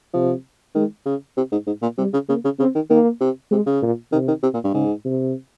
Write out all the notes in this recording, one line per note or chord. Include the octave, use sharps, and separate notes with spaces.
C3 F3
D#3 G#3
C#3
C3
G#2
G#2
A#2
C3 G3
C#3
C#3 A#3
C#3
C#3 C4
D#3
D#3 A#3
C3
C3 G#3
C#3
A#2
C3 D#3
D#3
C3
A#2
G2
G#2 C#3
C3